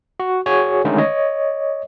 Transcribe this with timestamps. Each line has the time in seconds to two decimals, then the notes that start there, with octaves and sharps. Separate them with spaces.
0.20 F#4
0.46 F#4 G#4 C#5 G#5
0.85 D3 D#3 G#3 A3 C#4 D#4
0.98 C#5 D#5